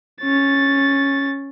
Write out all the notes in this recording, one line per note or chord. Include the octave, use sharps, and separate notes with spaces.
C#4 A6